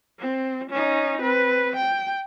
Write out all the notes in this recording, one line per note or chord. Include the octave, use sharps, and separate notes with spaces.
C4
C#4 D#4
C4 B4
G5